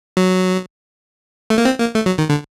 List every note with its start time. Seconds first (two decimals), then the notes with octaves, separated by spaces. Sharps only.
0.17 F#3
1.50 A3
1.58 A#3
1.65 C4
1.80 A#3
1.95 A3
2.06 F#3
2.18 D#3
2.29 D3